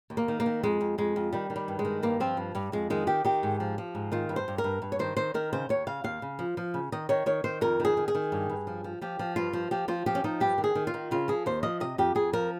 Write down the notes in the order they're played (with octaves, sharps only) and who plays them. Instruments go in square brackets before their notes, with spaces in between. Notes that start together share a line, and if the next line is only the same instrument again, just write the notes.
[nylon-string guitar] D#2
A#3
D#3
A#3
D#3
F2 G#3
F2
F2 G#3
F2
D#3 G3
D#3
G3
G2
G#3
D#3
G2 A#3
F3 C4
G2
G2 G3
F2 G#3
D#3 G#3
D#3 G4
D#3 G4
G#2
F3
F3
G#2
D#3 F4
G2
C5
G2
A#4
G2
G2
C#5
D#3 C5
D#3 C5
D#3 A#4
C#3 C5
D#2 C#5
C#3 F5
D#2 F5
C#3
F3
F3
C#3
D#3 D#5
D#3 C#5
D#3 C#5
D#3 C5
F2 A#4
D#3
G#4
D#3
G#4
D#3
G2
G2
F3
F3
F3 G4
F3
G2 F4
F3
F3 G4
F3 F4
F3 G4
C#4
F3 D#4
G2 G4
D#3
G#4
D#3
F4
D#3
C#3 F4
F3 G#4
D#2 C5
F3 D#5
C3 D#5
F2 G4
F2 G#4
F3 A#4